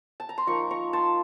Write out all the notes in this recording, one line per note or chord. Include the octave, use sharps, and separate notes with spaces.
A5
A#5
C6
F3 A#3 D#4 A#5 C#6
A#5 C#6
A5 C6